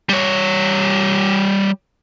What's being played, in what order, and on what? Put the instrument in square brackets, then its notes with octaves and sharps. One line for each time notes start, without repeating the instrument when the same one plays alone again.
[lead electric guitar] G3 C#5